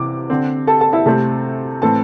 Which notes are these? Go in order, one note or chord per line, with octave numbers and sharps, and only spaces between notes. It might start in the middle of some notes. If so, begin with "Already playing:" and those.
Already playing: C3 E3 D6
D3 C4
A4 A5
A4 A5
E4 E5
C3 A3 C4 A4 A5
A2 E3 C4 A4 A5